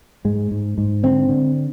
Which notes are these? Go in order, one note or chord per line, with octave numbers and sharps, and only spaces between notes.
G#2 G#3
G#2
G#2
D3 C4
D3